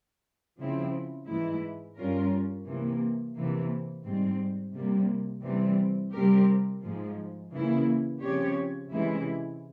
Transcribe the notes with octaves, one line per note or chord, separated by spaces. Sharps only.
C#3 F3 C4 E4
G#2 E3 G#3 E4
G2 G3 C#4 F4 A#4
C3 E3 A#3
C3 E3 A#3
G#2 G3 C4
C3 G3 A#3
C3 E3 G3 C4
C3 G3 C4 G4 A#4
G#2 F3 G#3
C#3 E3 A#3 E4
C#3 F3 C4 G4 C#5
C3 E3 G#3 C#4 E4